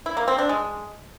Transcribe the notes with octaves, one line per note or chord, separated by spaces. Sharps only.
E4
A#3
C4
D4
G#3